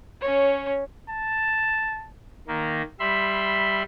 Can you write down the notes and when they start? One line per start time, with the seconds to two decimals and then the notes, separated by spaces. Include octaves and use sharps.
0.20 C#4 C#5
1.09 A5
2.48 D#3 A#3
3.00 G3 E5 B5 C6